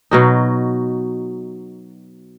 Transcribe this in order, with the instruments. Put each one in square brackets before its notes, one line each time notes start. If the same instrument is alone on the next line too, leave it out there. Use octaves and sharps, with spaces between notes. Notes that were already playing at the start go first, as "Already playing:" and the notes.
[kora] B2 F#3 D#4